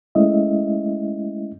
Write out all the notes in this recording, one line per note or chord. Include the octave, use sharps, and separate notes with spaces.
G#3 A3 C#4 E4 D#5 E5